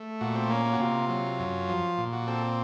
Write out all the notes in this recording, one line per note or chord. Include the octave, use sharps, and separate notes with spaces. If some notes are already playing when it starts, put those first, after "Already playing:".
Already playing: A3
A#2 F#4
C4
A#3 C#4
C#4
F#4
C3 F4
F#3
F#2
F3
A#2
F#4
C4 A4